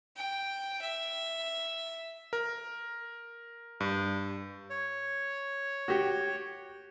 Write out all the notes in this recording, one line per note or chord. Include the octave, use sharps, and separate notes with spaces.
G5
E5
A#4
G2
C#5
F#4 G4